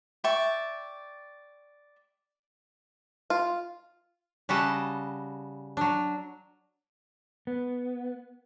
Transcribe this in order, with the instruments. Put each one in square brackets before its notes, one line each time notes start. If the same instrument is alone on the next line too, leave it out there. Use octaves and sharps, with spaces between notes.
[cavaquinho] D5 E5 G5 C#6
[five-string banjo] F4
[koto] C#3 G3 F#4 B4 D#5 A5
F#3 D4
[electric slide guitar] B3